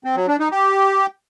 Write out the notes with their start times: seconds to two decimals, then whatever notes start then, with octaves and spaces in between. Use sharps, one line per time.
0.04 C4
0.16 F#3
0.28 D4
0.40 D#4
0.51 G4